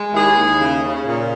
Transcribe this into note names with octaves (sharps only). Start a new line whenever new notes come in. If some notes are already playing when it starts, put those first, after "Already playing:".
Already playing: G#3
D#2 E4 G#4
D#2
C#3
C#3
A#2